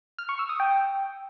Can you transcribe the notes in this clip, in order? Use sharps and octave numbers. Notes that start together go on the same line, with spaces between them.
F6
C#6
E6
D#6
G5